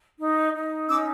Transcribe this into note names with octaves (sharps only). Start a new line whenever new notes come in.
D#4
D#4
C#4 D6 E6